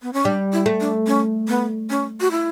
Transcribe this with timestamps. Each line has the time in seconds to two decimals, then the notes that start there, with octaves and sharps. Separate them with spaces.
0.02 B3
0.13 C#4
0.25 G3 D4
0.53 E4
0.66 A3
0.80 D4
1.07 C#4
1.48 B3
1.90 C#4
2.21 F#4
2.31 E4